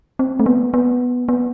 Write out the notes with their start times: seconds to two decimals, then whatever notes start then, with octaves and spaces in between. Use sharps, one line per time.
0.19 C4
0.40 A3
0.46 B3
0.74 B3
1.29 B3